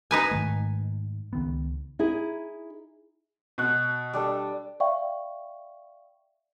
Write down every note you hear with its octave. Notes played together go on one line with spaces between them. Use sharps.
D#4 B4 G#5
G#2 D#3 A3
C#2 D#3 B3
D#4 E4 G#4
B2 F#6
G3 D4 A4
D5 E5 F5 G5 C#6